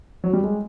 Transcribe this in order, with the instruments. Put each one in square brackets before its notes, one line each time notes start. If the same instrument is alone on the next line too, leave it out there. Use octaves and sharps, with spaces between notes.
[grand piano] F#3
G3
G#3